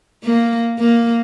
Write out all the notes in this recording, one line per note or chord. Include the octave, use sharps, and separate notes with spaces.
A#3
A#3